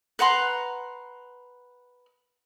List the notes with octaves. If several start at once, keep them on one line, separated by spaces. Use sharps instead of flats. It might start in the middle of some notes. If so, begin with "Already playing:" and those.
B4 F#5 A#5 C6